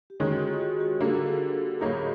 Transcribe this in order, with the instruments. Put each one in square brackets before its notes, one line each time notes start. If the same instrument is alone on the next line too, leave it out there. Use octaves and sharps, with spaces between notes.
[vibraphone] G4
[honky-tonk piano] D#3 G#3 C#4 [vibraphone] F#4 G#4
[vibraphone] F4 G4
F#4 G#4
F#4 G#4
[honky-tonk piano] D3 G3 A#3 [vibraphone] A4
[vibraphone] A#4
G4 A4
[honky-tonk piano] A2 F#3 A#3 D#4 [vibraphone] F#4 G#4